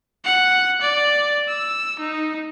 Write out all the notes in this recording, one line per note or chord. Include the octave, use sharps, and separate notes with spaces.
F#5
D5
E6
D#4